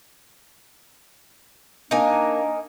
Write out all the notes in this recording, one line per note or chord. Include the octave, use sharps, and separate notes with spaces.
A#3 D4 D#4 A#4 G#5